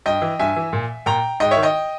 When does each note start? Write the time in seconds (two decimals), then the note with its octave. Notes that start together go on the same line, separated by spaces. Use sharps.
0.06 G2 D#5 G5
0.22 E3
0.39 G2 E5 G#5
0.56 E3
0.73 A#2
1.06 A#2 G5 A#5
1.40 G#2 D#5 G5
1.51 C#5 E5
1.57 D#3
1.62 D#5 G5